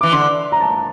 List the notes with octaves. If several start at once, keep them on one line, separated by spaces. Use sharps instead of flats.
E3 D6
D3 C6
A#5
A5